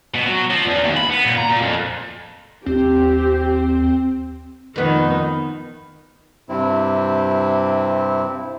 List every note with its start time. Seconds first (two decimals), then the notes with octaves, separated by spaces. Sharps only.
0.14 B2
0.26 F#3
0.50 F3
0.64 E2
0.84 D#2
0.97 B5
1.09 B3
1.25 A#2
1.37 A#5
1.49 A#2
1.62 F2
2.66 D#2 C4 G4
4.76 F2 D#3 B3 D#4
6.49 G2 C3 C4 E4